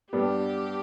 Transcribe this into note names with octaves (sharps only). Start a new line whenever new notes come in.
G2 G3 B3 D4 G4